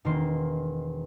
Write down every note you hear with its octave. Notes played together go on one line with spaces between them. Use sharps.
E1 D#3 A#3 C6